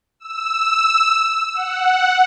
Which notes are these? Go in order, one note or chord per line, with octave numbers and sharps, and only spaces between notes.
E6
F#5